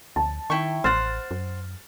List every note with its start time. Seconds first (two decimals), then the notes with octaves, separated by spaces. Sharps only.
0.16 D2 A5
0.50 D#3 E4 G5 C#6
0.84 A1 C5 F#5 F6 A6
1.31 F#2